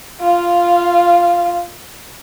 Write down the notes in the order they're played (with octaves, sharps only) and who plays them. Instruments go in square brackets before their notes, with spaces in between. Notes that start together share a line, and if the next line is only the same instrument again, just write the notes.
[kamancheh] F4 F5